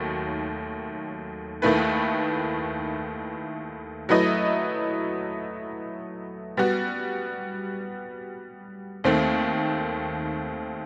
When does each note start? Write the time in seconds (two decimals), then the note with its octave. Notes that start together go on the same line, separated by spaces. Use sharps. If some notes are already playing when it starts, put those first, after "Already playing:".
Already playing: D#2 D#3 F#3 A3
1.62 D#2 D#3 A3 E4 B4
4.09 F#3 A3 E4 B4 D#5
6.57 G3 B3 F#4
9.04 D#2 D#3 A3 C4